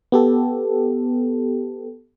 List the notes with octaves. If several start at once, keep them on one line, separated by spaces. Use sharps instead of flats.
B3 G4 A4